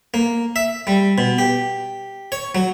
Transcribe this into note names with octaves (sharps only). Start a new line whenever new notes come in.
A#3
E5
G3
B2
G4
C#5
F#3